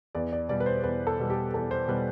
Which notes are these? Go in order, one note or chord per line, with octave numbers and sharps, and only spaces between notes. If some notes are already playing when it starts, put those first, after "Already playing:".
E2 D5
D5
B2 G3 D5
B4
C5
E2 B4
A4
B2 G3
G4
E2 A4
C5
B2 G3 B4